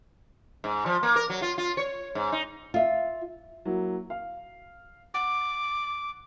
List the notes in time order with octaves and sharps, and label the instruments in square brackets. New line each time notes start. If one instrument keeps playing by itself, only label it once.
[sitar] G#2
F3
A#3
A#4
F#3
F4
F4
C#5
G#2
D#4
[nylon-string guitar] F4 E5
[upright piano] F#3 A#3 E4
F5
[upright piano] F#5 [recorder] D6